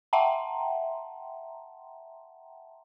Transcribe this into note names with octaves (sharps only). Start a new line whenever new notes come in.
E5 F#5 G5 A5 A#5 C6